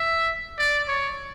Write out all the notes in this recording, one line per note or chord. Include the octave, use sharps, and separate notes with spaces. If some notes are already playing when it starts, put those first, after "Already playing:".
Already playing: E5
D5
C#5